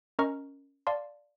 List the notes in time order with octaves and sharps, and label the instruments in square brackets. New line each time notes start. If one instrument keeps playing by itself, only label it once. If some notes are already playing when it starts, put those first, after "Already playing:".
[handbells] C#4 A#4 D#5 A#5 C#6 F6
D5 F5 A5 C6